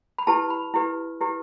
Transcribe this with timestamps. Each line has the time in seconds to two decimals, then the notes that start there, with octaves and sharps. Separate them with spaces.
0.18 B5
0.27 E4 G4 B4 A5
0.50 B5
0.74 E4 G4 B4
1.21 E4 G4 B4